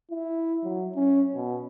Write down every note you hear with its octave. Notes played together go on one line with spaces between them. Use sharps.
E4
F#3
C#4
B2